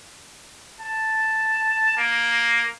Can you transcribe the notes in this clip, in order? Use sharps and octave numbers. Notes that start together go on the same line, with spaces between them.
A5
A#3